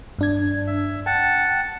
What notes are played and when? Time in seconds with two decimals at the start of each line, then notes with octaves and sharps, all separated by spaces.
0.19 G2 D4 G#6
0.67 E5
1.06 F#5 G5 A5